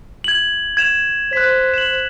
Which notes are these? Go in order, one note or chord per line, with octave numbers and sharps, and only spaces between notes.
G#6 F#7
G#6 E7 F7
C5 F#6 B6
E7 F#7